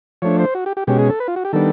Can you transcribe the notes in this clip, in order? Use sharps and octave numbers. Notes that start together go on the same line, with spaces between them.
F3 A3 D4 C#5
C5
F#4
G4
G4
B2 G#3 C#4 G4
G#4
A4
B4
F4
F#4
G4
D#3 G3 B3 D4 A4